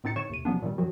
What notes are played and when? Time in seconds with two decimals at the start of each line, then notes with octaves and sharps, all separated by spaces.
0.04 A2 C4 D#4 A6 C#7
0.16 D3 C#5 C#6 C#7 E7
0.30 D#2 C3 D#7
0.45 C3 F3 F#3 B3 C#4 D4
0.62 A#2 D#3 G3
0.78 F#2 D#3 F3 F#3 F#4